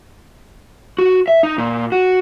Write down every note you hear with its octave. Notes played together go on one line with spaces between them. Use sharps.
F#4
E5
D#4
A#2
F#4